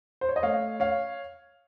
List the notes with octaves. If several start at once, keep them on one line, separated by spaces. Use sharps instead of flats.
C5
C#5
D#5
A3 C#5 F5
C#5 F5